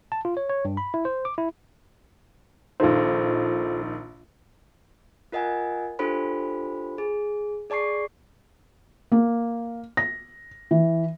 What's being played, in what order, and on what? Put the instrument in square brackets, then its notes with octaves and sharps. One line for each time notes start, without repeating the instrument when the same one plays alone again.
[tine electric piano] A5
F4
C#5
C#5
G2
B5
E4
C5
D6
E4
[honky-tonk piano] A#1 D#3 [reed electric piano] F4 A4 C5
[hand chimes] F4 A#4 D#5 F#5 G#5
D4 F4 G4 A4 C5 B5
G#4
G#4 D5 A5 C#6 C7
[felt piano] A#3
A#6
E3